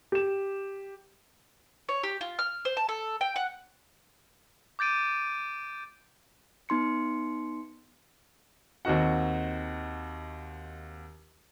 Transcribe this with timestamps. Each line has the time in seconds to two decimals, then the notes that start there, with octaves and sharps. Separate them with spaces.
0.12 G4 E7
1.89 C#5
2.03 G4
2.21 F4
2.39 F6
2.65 C5
2.77 A5
2.89 A4
3.21 G5
3.36 F#5
4.79 D6 G6 A6 D7 D#7
6.69 B3 D#4 C6 C#7
8.85 D#2 C4 D#4 F#4 F#5